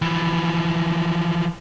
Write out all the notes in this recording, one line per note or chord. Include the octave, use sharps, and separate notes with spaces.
E3 F3